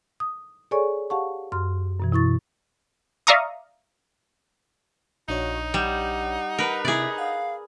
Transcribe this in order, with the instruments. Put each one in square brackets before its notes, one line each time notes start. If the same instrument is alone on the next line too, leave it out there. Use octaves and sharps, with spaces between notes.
[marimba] D#6
G#4 A4 C#5 D5 G#5 C#6
G4 F5 F#5 A5 C#6
F#2 C6 F6
F#2 B2 E3
B2 E4 C#6 A6
[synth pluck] D5 E5 F5 A#5 C#6 D#6
[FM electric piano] A#1 D4 C#5 [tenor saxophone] D#4 [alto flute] F#4
[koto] G3 [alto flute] F#5
[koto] A#4 B4
[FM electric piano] C3 E4 [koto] G#4 D5 [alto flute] E5
[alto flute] F5 [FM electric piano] F#5